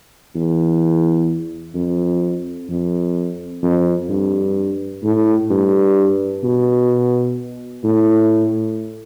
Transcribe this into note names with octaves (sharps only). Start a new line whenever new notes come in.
E2
F2
F2
F2
G2
A2
G2
B2
A2